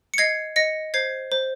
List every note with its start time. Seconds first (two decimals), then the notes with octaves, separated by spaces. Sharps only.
0.14 C#7
0.18 D#5 G#6 C7
0.56 D#5 A#6 C#7
0.94 C5 G#6 C7
1.32 C5